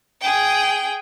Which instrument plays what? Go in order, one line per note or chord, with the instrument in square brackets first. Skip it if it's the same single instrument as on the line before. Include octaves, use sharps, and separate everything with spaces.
[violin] G#4 G5